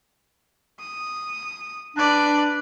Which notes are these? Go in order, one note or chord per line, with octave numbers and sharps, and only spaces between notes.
D#6
D4 B4 D5